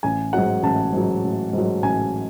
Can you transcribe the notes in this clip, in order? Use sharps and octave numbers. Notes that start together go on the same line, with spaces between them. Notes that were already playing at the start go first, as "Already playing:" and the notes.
A1 G#5
G#2 F#3 F#5
A1 A5
G#2 F#3
A1
G#2
F#3
A1 G#5